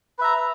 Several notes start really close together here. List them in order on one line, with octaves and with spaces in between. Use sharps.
B4 E5 A#5